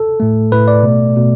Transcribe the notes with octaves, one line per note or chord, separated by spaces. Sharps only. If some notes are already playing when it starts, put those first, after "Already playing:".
Already playing: A4
A2 A3
A2 A3 B4
D5
B2 A3
B2 A3